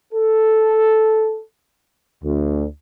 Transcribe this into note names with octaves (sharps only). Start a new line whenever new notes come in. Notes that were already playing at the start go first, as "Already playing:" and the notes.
A4
D2